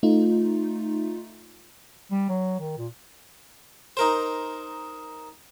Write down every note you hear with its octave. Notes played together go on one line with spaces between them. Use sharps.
A3 D#4 F4
G3
F#3
D#3
A#2
D#4 A#4 C5